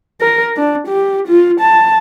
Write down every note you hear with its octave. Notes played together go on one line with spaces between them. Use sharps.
A#4
D4
G4
F4
A5